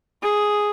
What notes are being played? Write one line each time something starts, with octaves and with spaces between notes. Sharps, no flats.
G#4